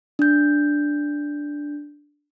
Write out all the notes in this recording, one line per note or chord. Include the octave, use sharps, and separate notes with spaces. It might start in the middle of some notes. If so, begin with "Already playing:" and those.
D4 G6